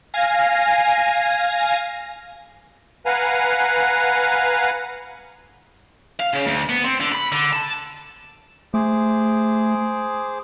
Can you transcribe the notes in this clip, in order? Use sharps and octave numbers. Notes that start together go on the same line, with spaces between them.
F5 G#5 A#6
B4 F5 F#5 G#5 A#5
F5
C#3
D2
B3
C4
D3
B5
D3
A5
A3 G#4 C5 D6